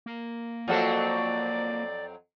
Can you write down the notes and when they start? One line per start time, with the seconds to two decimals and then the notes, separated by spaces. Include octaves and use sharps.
0.06 A#3
0.68 F2 F#3 C4 F4 F#4 A4 D5